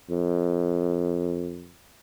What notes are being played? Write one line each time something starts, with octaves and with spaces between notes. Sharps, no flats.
F2